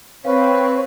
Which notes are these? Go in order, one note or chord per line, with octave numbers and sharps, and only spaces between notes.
C4 B4 C#5 F5 B5